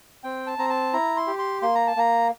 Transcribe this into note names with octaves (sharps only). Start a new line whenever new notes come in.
C4 G5
A5
C4 A#5
A5
E4 A#5
C6
G4
C6
A#3 C6
A#5
A5
A#3 A#5